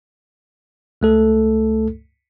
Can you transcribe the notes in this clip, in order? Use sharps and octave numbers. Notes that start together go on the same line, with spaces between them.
C#2 A3 A4